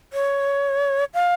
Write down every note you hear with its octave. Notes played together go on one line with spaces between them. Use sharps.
C#5
F5